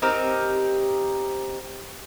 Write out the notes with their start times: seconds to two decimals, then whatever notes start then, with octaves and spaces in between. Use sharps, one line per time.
0.02 C4 D#4 G4 A#4